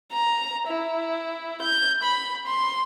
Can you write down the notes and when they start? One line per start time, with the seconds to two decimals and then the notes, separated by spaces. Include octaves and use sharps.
0.12 A#5
0.67 E4
1.62 G6
2.03 B5
2.47 C6